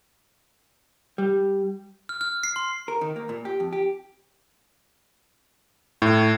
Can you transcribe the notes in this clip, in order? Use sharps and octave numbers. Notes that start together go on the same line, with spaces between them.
G3
F6
F6
C7
C6
A#4
D#3
A#3
A#2
G4
F2
G4
A2